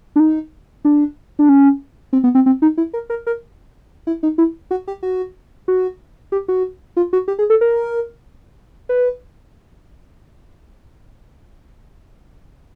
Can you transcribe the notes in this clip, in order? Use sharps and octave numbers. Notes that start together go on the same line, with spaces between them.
D4
D#4
D4
D4
C#4
C4
B3
C4
C4
D#4
E4
A#4
A#4
A#4
E4
D#4
E4
F#4
G4
F#4
F#4
G4
F#4
F4
F#4
G4
G#4
A4
A#4
B4